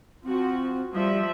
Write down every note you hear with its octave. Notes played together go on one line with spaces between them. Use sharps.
F3 C4 F#4
F3 G3 E5